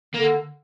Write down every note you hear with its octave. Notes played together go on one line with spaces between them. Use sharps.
D3 A#3